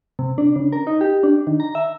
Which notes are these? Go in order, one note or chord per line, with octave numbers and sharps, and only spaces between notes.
C3
D4
C#3
A#4
D#4
G4
D4
D#3
A#5
E5